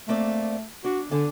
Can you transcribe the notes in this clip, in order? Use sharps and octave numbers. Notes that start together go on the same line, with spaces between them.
A3 A#3 C4 D5
D4 F#4
D3 D4 G#5